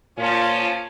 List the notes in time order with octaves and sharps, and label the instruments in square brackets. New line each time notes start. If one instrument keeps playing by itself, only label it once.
[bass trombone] A#2 [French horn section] F3 C#4 [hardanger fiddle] F4 A5